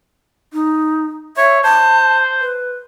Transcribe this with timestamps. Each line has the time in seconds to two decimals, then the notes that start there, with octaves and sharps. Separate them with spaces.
0.53 D#4
1.37 C#5 E5
1.64 C5 A5
2.41 B4